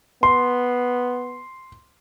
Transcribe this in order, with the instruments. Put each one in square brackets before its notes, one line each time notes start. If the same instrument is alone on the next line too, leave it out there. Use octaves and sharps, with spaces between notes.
[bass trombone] B3 [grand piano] C6